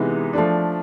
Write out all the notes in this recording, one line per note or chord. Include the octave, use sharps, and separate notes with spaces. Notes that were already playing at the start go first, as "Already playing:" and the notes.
Already playing: C3 E3 G#3 B3 D#4
F3 A3 D4